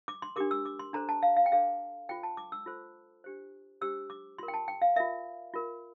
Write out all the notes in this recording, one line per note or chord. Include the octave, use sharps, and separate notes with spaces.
D6
C6
D4 G4 A#4 D6
E6
D6
C6
D4 A4 C5 A#5
A5
F5
F5
G5
D4 A4 C5 F5
F4 A4 C5 G5
A5
D6
E6
F4 A4 C5
D4 G4 C5
D4 G4 C5 E6
D6
F4 A#4 C6
G5
A5
G5
F5
F4 A#4 E5
F4 A#4